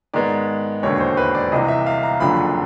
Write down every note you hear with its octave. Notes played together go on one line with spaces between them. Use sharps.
G#2 D#3 G#3 B3 D5
E1 D#2 D3 C#5
C5
B4
D5
C2 C3 E3 D#5
E5
F5
A#5
F#1 F2 D3 F#3 B5